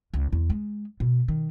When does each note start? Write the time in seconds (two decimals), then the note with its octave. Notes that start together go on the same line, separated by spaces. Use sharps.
0.14 C#2
0.32 E2
0.50 G#3
1.00 B2
1.28 D#3